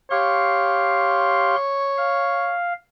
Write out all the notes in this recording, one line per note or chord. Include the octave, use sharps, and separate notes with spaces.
G4 C#5 F5 C6
F5